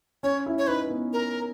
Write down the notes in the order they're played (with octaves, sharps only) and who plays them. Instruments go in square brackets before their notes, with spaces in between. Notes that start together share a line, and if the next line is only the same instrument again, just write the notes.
[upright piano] C#4 [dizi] C#5
[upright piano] E4
[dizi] C#5
[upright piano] D#4 [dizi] B4
[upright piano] B3
[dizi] A#4